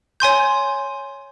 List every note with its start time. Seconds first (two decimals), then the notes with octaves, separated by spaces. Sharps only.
0.20 C#5 G#5 C6 G6